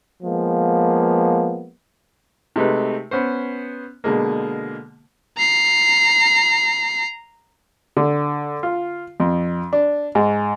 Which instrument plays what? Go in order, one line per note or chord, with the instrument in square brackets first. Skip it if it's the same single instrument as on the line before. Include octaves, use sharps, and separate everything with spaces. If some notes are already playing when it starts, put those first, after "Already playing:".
[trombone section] F3 G#3 A#3 B3
[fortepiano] C3 G#3 A3 D#4 B4
B3 C#4 C5
B2 D3 G#3 A#3
[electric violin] A#5 C7
[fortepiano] D3
F4
F2
D4
G#2